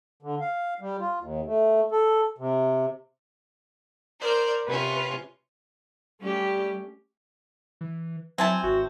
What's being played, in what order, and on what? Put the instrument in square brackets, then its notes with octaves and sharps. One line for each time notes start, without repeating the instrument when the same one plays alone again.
[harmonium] D3
F5
G3
F4
D#2
A3
A4
C3
[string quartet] A#4 C5 D5
[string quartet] C3 C#4 F4 [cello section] B4
[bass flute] G3 [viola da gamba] A3 C#4 G4
[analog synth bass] E3
[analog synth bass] F#3 [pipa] C4 E4 A5 [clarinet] G#5
[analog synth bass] G#1 [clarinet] F#4